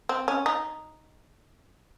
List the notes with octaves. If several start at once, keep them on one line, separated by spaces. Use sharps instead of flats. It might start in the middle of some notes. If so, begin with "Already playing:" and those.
C4
C#4
D#4